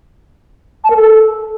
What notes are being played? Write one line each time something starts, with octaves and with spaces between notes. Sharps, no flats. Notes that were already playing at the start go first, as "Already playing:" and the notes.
A5
A#4
A4